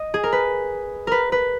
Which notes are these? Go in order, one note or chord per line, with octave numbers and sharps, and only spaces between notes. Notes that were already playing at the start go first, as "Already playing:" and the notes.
Already playing: D#5
G#4
A#4
B4
A#4 B4
B4